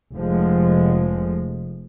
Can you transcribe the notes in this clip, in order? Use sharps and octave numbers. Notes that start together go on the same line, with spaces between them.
F1 F3 G#3